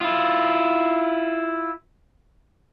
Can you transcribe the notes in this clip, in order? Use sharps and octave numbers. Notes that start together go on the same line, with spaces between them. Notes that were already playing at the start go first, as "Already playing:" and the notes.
E4 F4